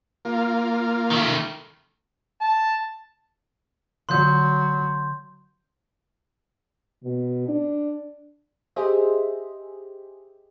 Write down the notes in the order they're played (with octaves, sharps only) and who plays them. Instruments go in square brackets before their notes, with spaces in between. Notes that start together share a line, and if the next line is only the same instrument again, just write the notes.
[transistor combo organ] A#3 F4
[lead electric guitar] D#3 A3
[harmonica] A5
[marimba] D3 [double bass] F#3 [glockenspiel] C6 G6
[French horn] B2
D4
[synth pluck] G4 G#4 C5 D#5 E5